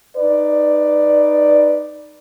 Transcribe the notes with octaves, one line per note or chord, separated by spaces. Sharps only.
D#4 B4 D5